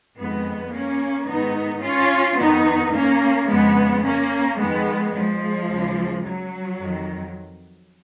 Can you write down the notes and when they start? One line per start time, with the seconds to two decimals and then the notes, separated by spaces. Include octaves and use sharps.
0.17 F2 D#3 G#3 B3
0.72 A#3 C#4
1.27 G#2 D#3 B3 D#4
1.82 C#4 F4
2.38 F2 D#3 B3 D#4
2.93 A#3 C#4
3.48 F2 C#3 G#3 B3
4.03 A#3 C#4
4.59 F2 D#3 G#3 B3
5.14 F3 G#3
5.69 D#2 C#3
6.24 F#3
6.80 F2 D#3